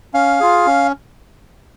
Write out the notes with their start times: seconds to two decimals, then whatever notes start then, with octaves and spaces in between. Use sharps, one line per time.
0.14 C#4 F5
0.40 F4 G#4
0.66 C#4